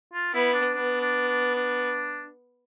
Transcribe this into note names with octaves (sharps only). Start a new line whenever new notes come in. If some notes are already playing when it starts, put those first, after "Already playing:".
F4
B3 E4
D4
B3 D4
D4
D4
D4